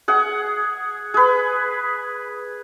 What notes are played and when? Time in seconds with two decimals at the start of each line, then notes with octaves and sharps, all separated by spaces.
0.08 G#4 F#5
1.14 G#4 B4